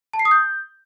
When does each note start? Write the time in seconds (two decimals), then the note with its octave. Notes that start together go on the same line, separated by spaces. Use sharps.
0.13 A5
0.19 C7
0.25 D#6
0.31 G6